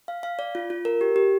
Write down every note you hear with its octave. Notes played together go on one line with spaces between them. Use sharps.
F5
F5
D5
F4
F4
A#4
G4
G4